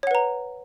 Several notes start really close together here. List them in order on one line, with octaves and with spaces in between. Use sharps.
C#5 F#5 B4 A#5